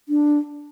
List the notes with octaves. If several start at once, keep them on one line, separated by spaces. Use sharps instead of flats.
D4